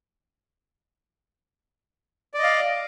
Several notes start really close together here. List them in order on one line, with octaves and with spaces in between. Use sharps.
D5 D#5 F5